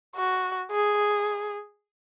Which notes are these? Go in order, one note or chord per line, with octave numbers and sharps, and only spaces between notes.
F#4
G#4